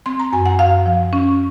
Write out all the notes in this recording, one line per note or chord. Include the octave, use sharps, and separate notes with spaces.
C4 C6
A#5
F#2 G#5
F#5
F#2 F5
F3
C#4